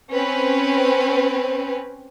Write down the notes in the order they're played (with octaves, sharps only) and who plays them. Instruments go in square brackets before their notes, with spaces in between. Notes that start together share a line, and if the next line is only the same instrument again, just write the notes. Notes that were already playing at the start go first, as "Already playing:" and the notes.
[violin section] C4 C#4 B4